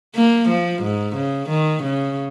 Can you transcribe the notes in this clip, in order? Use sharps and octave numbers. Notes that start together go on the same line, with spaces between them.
A#3
F3
G#2
C#3
D#3
C#3